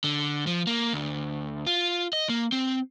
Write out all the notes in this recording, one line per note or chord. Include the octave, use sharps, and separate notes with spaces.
D3
F3
A#3
D2
F4
D#5
A#3
C4